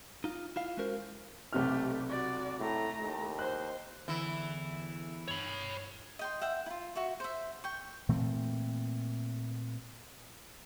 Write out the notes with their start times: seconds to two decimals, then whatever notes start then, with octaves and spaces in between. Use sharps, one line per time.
0.24 D#4 F4
0.56 E4 F4 F5
0.77 G#3 C#4 F#4 A#4 C5
1.53 B1 C3 A3 G4 F6
2.09 F#4 D5
2.59 A2 A3 A#5
3.00 D#2
3.39 C5 F#6
4.08 E2 D3 E3 E4
5.28 G2 C#5 B5
6.19 D#5 G5 C6
6.42 E5 F#5 G5
6.66 E4 F4
6.95 F#4 E5 C#6
7.20 C5 E5
7.64 G5 C#6
8.09 A#2 E3 A3 C4